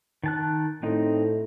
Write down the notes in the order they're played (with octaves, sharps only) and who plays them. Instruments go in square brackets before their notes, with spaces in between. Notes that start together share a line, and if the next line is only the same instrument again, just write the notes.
[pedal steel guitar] D#3 A5 F#6
[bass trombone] A2 [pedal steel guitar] C4 D#4